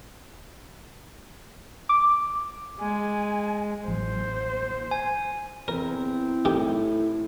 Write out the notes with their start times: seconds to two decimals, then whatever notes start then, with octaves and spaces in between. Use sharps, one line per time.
1.89 D6
2.80 G#3 G#5
3.88 A1 F#3 C5
4.91 G#5
5.68 E2 C4 E4 A#4
6.45 A2 D#3 G4